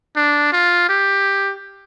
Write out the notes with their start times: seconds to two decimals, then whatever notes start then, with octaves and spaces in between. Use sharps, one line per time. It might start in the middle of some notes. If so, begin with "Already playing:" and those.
0.16 D4
0.52 F4
0.89 G4